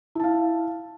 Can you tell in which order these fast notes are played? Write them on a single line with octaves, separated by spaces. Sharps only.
E4 A5 F5